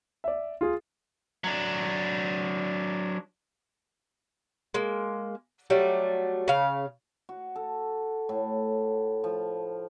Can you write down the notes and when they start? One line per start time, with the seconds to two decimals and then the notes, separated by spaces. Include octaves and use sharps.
0.24 D5 E5
0.61 F4 G#4
1.44 F#3 D4
4.74 G#3 A#3
5.70 F#3 G3 A3
6.48 C#3 F5
7.29 F#4
7.56 A4
8.29 A2
9.24 F3